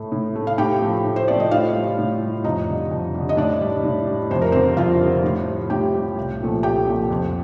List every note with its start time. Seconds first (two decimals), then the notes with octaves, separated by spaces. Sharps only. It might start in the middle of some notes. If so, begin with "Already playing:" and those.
Already playing: A2 A3
0.12 A2
0.36 A3
0.47 F5
0.58 A2 G4 G5
0.81 F3 A3
1.05 A2
1.16 C5
1.28 F3 A3 D5
1.40 D#5
1.51 A2 F4 F5
1.75 G3
1.99 A2
2.22 G3
2.44 F2 D#4 D#5
2.68 D3 G3
2.91 F2
3.14 D3 G3
3.29 D#5
3.37 A2 D4 D5
3.61 G3
3.84 A2
4.07 G3
4.31 F2 C5
4.42 A#4
4.52 D3 G3 C4 C5
4.77 F2 F4 F5
5.01 D3 G3
5.24 A2
5.48 G3
5.70 A2 G4 G5
5.94 G3
6.17 C2
6.41 A#2 F3 A3
6.63 C2 G4 G5
6.87 A#2 F3 A3
7.11 F2